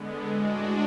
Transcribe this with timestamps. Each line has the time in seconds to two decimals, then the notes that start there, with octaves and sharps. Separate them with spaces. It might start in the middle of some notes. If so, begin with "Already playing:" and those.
Already playing: D3 G#3 B3
0.26 A2 G#3 D4 F#4